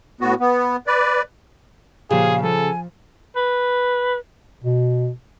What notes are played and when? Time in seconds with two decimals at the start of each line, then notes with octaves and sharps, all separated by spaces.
0.21 A2 B3 F#4
0.40 B3
0.87 B4 D5
2.11 A#2 C#3 F3 G4 G#4 F5
2.43 F3 A4 G#5
3.36 B4
4.63 B2